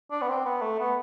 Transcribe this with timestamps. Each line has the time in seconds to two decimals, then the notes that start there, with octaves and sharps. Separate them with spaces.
0.11 D4
0.22 B3
0.28 C4
0.46 B3
0.62 A3
0.80 B3